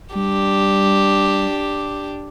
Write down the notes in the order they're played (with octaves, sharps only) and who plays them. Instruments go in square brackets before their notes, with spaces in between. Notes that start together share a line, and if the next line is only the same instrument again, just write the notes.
[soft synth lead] G3 [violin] D4 G4